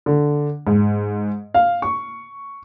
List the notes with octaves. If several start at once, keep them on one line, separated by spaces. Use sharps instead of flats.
D3
G#2
F5
C#6